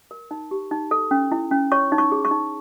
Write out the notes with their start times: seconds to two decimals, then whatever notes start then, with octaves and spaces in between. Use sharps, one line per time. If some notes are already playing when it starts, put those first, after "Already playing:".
0.11 A#4
0.31 D#4
0.51 G4
0.71 D#4
0.91 A4
1.11 C#4
1.32 E4
1.51 C#4
1.72 C#5 C#6
1.92 D#4
1.98 C#6
2.12 G#4
2.25 C#6
2.31 D#4